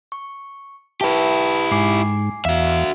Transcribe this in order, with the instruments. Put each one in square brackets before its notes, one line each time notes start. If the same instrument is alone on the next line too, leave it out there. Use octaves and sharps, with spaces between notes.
[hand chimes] C#6
[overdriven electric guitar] E4 G4 [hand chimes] B4 E5 A5
[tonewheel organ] G#2 [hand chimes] G#5 D6 C7
[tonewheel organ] E2 [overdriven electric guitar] F#4 E5 [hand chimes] F5